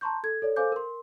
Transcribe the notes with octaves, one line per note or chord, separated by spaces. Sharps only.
A5 A#5 C6 C#6 G6
A4 G#6
A4 C#5 D5
A4 C5 F5 G#5 D6 G6
A#4 C6